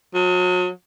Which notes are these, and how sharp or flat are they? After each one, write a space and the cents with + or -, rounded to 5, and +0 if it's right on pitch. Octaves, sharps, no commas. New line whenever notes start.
F#3 -40